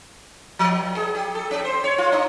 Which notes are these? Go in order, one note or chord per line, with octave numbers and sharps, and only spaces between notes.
F3
G2
G#4
G4
A4
C#4
C5
C#5
F4
D4